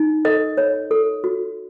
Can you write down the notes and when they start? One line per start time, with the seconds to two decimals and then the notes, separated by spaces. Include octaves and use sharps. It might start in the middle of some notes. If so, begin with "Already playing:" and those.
Already playing: D#4
0.25 A4 D#5
0.57 C#5
0.91 A4
1.24 F#4